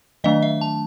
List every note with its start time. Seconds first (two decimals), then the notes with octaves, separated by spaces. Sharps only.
0.24 D#3 F#3 A3 D4 D#5
0.43 E5
0.61 A5